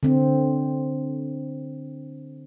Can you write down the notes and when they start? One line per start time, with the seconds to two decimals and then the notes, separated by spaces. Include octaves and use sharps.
0.03 D3 C4